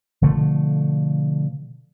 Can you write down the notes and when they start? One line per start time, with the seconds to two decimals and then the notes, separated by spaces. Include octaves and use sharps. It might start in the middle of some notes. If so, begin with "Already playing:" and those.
0.22 B2 D3 F3 A3